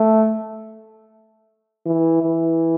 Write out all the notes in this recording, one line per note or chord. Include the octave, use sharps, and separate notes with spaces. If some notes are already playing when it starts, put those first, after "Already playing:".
Already playing: A3
E3
E3